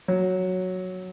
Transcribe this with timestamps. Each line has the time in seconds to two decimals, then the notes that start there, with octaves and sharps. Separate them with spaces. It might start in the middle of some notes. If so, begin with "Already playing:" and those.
0.08 F#3